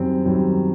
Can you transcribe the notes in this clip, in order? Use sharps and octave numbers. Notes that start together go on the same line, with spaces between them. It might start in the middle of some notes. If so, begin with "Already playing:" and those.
Already playing: F#2 D#3 G3 C4
F#2 D#3 G3